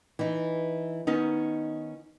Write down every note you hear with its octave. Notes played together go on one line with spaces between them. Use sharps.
E3 D#4
D#3 B3 C#4 D#4